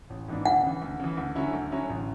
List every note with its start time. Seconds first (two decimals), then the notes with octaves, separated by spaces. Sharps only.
0.10 A1
0.28 G#2 E3 B3 D4
0.45 D2 F#5
0.63 C#3 E3
0.82 D2
1.00 C#3 E3
1.17 D2
1.35 D3 F#3 C#4 E4
1.53 D2
1.72 D3 F#3 C#4 E4
1.89 A1